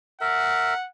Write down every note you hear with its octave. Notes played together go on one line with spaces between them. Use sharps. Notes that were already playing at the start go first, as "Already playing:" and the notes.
A#4 E5 F#5